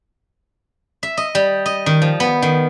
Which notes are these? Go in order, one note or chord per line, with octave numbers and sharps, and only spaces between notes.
E5
D#5
G3
D#5
D#3
F3
B3
D#3